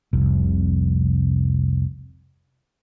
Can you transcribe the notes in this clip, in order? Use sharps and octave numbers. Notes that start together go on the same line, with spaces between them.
F1 C2